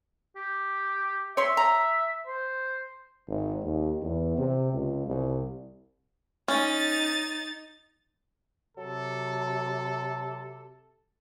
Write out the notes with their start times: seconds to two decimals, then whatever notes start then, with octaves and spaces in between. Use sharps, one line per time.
0.36 G4
1.37 C#5 E5 C6
1.57 A#5
2.26 C5
3.27 G#1
3.63 D#2
4.02 E2
4.37 C3
4.73 C#2
5.07 C2
6.48 C#4 D#4 A6
8.77 C3 F#3 A4